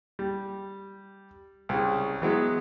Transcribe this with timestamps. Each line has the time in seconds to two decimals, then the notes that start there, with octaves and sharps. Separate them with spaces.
0.19 G3
1.69 C2 C#3
2.22 E3 F#3 G#3 B3